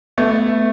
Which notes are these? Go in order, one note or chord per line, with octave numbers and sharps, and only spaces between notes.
A3 B3